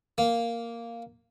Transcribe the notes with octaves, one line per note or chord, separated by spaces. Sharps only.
A#3